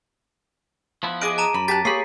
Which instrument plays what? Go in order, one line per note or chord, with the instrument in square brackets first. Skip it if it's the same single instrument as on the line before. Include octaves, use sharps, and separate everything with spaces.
[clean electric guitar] F3 B3 E4
[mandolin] G#4 D#5 F#6 [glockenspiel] D6 D7
[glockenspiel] A5 A#5 D#7
[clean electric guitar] F#2 [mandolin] B5
[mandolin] G4 A5 F#6 [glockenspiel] A6 B6
[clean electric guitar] A#3 B5 [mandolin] G4 G#4 C#5 [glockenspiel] C7